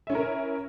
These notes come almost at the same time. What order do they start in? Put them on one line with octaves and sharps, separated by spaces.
E5 C#4 E4 A#4